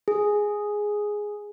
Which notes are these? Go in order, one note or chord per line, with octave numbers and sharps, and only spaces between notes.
G#4